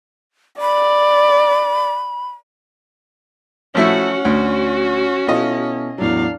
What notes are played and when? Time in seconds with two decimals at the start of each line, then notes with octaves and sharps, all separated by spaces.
0.61 D5 B5
3.75 F3 A3 C#4 E4 F#4 F#5
4.25 D2 F#4
5.27 B2 E4 F4 A4 D#5
5.98 E2 A2 F#3 D4 F5